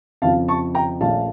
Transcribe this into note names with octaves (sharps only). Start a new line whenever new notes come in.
F2 C#3 F3 F5 A5
A5 C#6
G5 A#5
A#1 A#2 A3 C#4 F5 A5